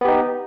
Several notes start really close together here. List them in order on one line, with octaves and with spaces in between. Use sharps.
B3 G4 D#4